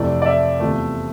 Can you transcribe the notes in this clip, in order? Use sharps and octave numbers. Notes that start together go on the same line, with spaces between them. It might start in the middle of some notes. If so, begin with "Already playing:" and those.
Already playing: F2 C3 E3 A3 D5
D5
E5
E2 C3 F3 A3